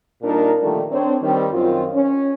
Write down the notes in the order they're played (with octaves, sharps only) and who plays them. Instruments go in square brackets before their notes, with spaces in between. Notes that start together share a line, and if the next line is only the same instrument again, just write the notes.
[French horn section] A#2 G3 D4 D#4 A#4
A#2 D3 D#3 F3 G3 A3
C4 D4 C#5
D#3 G3 C4
F#2 D#3 C4 F4
C#4